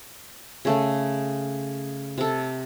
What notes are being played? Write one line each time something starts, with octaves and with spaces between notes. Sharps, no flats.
C#3 A3 C#4
C3 A4